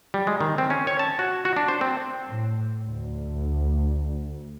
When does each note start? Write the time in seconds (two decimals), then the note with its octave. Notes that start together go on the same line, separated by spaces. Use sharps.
0.14 G3
0.27 G#3
0.41 D#3
0.58 C4
0.70 C#4
0.87 C#5
0.99 A5
1.19 F#4
1.45 F#4
1.56 D4
1.68 C5
1.81 C4
2.28 A2
2.86 D2